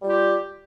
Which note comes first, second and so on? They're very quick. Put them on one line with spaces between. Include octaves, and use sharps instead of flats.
G3 F4 G4